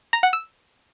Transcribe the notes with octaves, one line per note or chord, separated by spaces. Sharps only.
A#5
F#5
E6